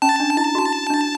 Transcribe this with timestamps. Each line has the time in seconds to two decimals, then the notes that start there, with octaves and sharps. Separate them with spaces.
0.02 C#4 A5
0.20 D4
0.37 E4
0.55 F#4
0.90 D4